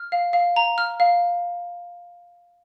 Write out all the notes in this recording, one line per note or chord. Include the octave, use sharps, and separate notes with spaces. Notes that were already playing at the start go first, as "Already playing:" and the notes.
Already playing: F6
F5
F5
A#5
F6
F5